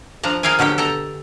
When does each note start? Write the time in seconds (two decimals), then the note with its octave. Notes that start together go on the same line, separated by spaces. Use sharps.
0.23 F3 D4 A#5
0.43 G#4 A#4 F5 G5 G#5
0.59 B2 D3 F#3 G4 G5
0.78 A4 G5 A#5